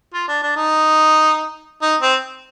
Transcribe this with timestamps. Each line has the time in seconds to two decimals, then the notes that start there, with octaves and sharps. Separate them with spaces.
0.14 F4
0.28 D4
0.42 D4
0.56 D#4
1.82 D#4
2.01 C4